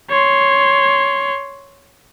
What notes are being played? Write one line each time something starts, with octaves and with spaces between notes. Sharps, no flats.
C#5 C6